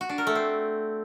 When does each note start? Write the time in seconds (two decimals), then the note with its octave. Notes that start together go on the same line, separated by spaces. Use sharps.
0.01 F#4
0.09 D4
0.18 A#4
0.27 A3
0.35 C4